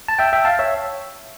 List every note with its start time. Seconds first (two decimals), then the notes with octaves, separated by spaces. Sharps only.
0.08 A5
0.19 E5 G5
0.33 E5 G5
0.45 F5 A5
0.59 C#5 E5